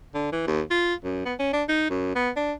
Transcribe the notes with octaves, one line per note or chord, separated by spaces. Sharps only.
D3
E3
D#2
F4
F#2
B3
C#4
D4
D#4
F#2
B3
D4